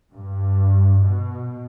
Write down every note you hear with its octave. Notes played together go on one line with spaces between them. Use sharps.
G2
B2